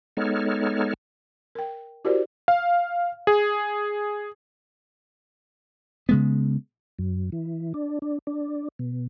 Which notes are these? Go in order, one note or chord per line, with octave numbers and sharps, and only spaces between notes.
G#3 B3 D#4 A4 C#5 F6
A#4 G5
E4 F#4 G4 A#4 C5 D5
F5
G#4
C#3 G#3 B3
F#2
E3
D4
D4
D4
B2